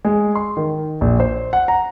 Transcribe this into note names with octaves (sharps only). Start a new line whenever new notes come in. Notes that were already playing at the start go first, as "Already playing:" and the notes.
G#3
C6
D#3
A#1
C5
F#5
A#5